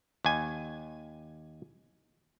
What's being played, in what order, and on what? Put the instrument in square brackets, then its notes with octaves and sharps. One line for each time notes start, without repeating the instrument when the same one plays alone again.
[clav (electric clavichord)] D#2 G#5